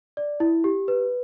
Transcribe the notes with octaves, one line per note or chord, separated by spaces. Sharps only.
D5
E4
G4
B4